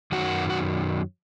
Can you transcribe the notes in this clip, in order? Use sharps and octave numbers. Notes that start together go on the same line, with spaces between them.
F#2 D#3 F#3 F#4
F#4